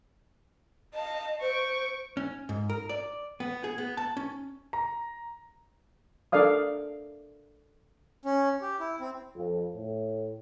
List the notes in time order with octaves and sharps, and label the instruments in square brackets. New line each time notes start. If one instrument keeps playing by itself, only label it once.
[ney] D#5 [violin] F5 A5
[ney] C5 [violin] C#6 D7
[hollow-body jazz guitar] C#4
G#2
A#4
D5
B3
G#4
B3
A5
C#4
[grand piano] A#5
[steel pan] D4 A4 A#4 D5 F5 D#6
[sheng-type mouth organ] C#4
G4
E4
C4
[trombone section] F2
A2